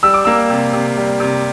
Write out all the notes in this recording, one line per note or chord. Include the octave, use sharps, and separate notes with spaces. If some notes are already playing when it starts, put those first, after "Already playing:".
G3 E6
D6
A#3 E6
C3
C3
G3
C3